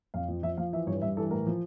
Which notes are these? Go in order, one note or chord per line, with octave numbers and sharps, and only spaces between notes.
F2 F5
F3
F3 E5
F3 F5
E3 E5
G2 C#5
G2 E5
E3 A4
A2 A#4
F3